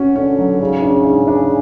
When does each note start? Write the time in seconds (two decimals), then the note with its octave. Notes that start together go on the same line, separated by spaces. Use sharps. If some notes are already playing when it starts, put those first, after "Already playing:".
Already playing: C#4 F#4
0.15 D3 C#4
0.38 F#3
0.60 G#2 C#3
0.82 D4
1.05 G#2
1.27 D4